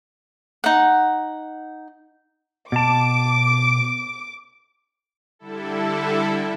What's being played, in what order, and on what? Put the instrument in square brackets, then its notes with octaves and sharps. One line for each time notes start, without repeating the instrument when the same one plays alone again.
[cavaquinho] D#4 F#5
[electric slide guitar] B2 A5 [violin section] D6
[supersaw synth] D3 G3 E4 A4